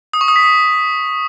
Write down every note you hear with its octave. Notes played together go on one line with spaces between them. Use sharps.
D#6
C#6
D#6
B6
D#6